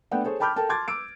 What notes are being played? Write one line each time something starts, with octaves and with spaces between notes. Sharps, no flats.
A3 B3 D4 F#5 G5
G#4 A4 C5 C#5
G5 A5 B5 D6 F6 G6
A4 A#4 G5 A5
A5 C6 D6 G#6 A6
D6 E6 D7